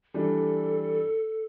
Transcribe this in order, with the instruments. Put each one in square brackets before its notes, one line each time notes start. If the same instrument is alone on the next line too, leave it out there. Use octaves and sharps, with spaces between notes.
[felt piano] E3 G3 D4 [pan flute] A4